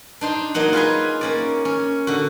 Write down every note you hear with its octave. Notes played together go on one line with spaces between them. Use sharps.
D4 D#4 C5
F#3 A#3 D#4 F#5
F4 G#4 B4 G#5
A#3 C#4 D5
C#4
D3 F#4